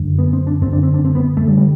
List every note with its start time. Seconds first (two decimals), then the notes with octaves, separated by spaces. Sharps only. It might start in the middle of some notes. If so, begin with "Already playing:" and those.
Already playing: F#2 D3
0.19 B3
0.33 C4
0.47 D4
0.62 F#2 C4
0.66 D3
0.73 D4
0.83 C4
0.94 D4
1.05 C4
1.15 B3
1.37 A3
1.47 D3 G3
1.58 G3